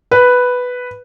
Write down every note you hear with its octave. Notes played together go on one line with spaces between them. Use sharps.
B4